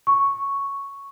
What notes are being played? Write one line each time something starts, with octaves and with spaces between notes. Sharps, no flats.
C#6